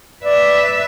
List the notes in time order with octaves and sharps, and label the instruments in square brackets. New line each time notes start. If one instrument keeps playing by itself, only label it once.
[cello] B4 E5 [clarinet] D5